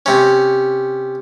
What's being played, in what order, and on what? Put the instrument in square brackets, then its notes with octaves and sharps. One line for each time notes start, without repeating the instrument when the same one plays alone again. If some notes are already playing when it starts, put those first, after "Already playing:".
[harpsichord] C3 C#4